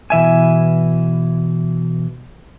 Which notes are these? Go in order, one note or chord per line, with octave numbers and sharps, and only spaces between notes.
B2 E3 E5 G#5